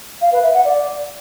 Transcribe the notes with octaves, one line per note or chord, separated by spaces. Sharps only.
F5
B4
E5
F#5
D5